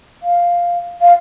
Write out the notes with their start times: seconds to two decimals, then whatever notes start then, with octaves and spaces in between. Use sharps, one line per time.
0.23 F5
1.01 F5